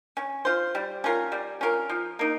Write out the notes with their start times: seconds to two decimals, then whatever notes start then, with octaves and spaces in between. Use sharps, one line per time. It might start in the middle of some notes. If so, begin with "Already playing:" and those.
0.17 C#4
0.45 F4 C5
0.75 G3
1.04 C#4 F4 A#4
1.32 G3
1.61 C#4 F4 A#4
1.90 F3
2.19 A#3 D#4